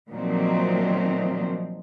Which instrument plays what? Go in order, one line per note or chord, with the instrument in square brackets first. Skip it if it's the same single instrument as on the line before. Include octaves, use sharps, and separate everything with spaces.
[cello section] A#2 D#3 F3 F#3 A3 C4